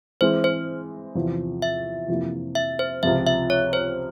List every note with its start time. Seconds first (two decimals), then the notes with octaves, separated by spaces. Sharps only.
0.21 E3 G#3 C4 C5
0.44 C5
1.15 E2 C3 F3
1.62 E5
2.08 F2 C3 E3 A#3
2.55 E5
2.79 C5
3.03 C#2 C3 F3 E5
3.27 E5
3.50 C#5
3.73 C5